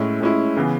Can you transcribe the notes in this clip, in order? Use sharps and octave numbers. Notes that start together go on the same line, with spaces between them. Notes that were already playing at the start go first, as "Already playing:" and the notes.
Already playing: A2 G#3 C#4 E4
A2 G#3 C#4 E4
C#3 E3 B3